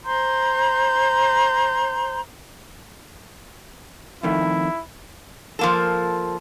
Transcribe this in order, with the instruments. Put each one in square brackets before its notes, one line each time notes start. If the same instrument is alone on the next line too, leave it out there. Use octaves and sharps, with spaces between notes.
[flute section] C5 A#5 C6 G6
[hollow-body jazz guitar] F2 D#3 A3 [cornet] E4
[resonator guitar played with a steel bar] F3 A#3 A4